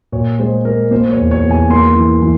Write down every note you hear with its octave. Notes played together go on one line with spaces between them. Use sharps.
A#2 C#5
G#3 C5
G#3 A#4
A#3 C5
C#5
E2
C#5
E2
G#5
A#3 C6
E3
E3